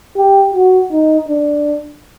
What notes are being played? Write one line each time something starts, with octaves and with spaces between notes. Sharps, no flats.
G4
F#4
D#4
D4